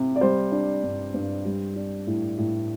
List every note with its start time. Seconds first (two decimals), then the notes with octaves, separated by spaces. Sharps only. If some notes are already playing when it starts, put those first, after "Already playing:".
Already playing: C3
0.16 D5
0.21 G3 C5
0.52 D4
0.83 G2
1.14 G2
1.45 G3
1.76 D4
2.07 A2
2.38 A2